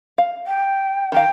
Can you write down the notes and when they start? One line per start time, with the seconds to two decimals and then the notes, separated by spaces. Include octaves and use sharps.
0.18 F5
0.46 G5
1.12 D#3 A#4 F5 G5